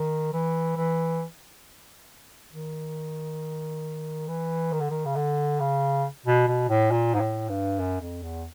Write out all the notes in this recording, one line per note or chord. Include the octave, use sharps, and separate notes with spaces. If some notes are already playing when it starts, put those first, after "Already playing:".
Already playing: D#3
E3
E3
D#3
E3
D#3
D3
D#3
C#3
D3
C#3
B2
B2
A2
A#2
G#2
A2
G2
F#2
F2
E2